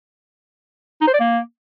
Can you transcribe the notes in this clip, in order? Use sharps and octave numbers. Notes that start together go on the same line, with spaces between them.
D#4
C5
D5
A#3